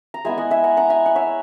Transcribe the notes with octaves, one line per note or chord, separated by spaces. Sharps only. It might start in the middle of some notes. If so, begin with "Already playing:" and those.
A#5
G#3 B3 E4 E5 G#5
D#5 F#5
E5 G#5
F#5 A#5
F#5 A#5
E5 G#5
F#5
C#5 E5